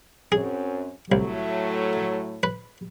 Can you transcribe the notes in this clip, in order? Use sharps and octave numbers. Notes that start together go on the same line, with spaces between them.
F#2 C4 C#4 G#4
C2 A2 F#3 A3
B4